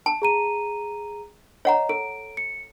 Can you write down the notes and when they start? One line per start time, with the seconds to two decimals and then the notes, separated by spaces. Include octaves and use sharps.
0.06 A5
0.22 G#4 A#5 D#7
1.65 C#5 D#5 F#5 A#5
1.89 A4 D7
2.37 C#7